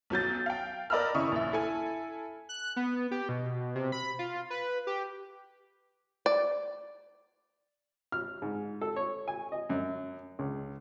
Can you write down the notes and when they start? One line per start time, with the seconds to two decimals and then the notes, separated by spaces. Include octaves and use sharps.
0.10 B1 F#3 G6 A6
0.46 F5 G5
0.90 A#4 D5 D#5 B5 E6 F6
1.15 C#3 E4 C#6 D#6
1.32 A#1 E5
1.52 E4 A4 G#5
2.49 F#6
2.76 B3
3.11 G4
3.29 B2
3.75 C3
3.92 B5
4.19 F4
4.50 B4
4.87 G4
6.26 D5
8.12 F6
8.42 G#2
8.81 A4
8.96 C#5
9.28 G#5
9.52 D#5
9.70 F#2
10.39 C#2